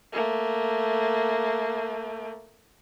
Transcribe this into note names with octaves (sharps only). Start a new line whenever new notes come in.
A3 A#3